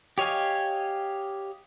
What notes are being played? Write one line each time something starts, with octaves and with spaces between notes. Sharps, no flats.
G4 C#5 D#5 F5 G#5